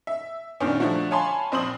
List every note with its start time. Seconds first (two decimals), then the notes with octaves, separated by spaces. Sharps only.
0.07 E5
0.60 G2 A#2 D#3 B3 C#4
0.80 D3 F3 F#3 A3 F#4
1.11 C#5 F5 G#5 A5 B5 C6
1.52 A#1 C4 C5 C6 D#6 F#7